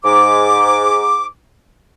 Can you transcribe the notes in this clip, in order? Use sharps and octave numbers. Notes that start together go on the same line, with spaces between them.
G#2 D6